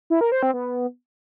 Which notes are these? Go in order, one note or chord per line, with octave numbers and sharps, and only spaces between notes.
E4
A#4
C5
C4
B3